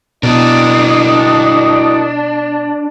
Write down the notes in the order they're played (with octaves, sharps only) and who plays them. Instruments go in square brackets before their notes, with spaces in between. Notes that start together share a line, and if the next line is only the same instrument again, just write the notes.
[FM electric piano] B2 [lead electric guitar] D4 [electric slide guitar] E4 F#4 A#4 [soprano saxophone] D#5